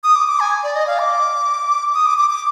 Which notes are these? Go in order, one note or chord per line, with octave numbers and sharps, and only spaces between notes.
D#6
D6
D6
G#5
D5
D#5
F5
D6
D#6
D6
D6
D6